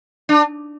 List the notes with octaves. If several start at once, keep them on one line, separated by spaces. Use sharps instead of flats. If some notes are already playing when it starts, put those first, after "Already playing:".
D4